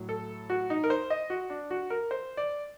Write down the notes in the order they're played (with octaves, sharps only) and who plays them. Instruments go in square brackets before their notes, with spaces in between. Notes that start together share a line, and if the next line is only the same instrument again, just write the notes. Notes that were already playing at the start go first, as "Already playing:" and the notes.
Already playing: [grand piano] A2 F#3
A4
F#4
D#4
A#4
C5
D#5
F#4
D4
F#4
A#4
C5
D5